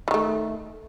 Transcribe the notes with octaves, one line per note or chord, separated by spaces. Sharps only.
D#3 E3 A3